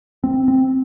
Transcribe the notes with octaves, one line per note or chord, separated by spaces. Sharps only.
C4
C4